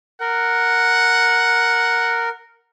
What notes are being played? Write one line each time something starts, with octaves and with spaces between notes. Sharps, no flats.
A#4 F#5